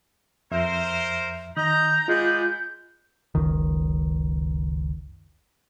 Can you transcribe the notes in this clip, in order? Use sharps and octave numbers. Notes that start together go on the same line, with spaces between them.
F2 A#4 C5 E5
D#3 D#5 A#5 G6
G#3 B3 F4 G#4 D5
F#1 C#2 D#3